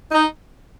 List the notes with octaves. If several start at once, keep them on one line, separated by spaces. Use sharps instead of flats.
D#4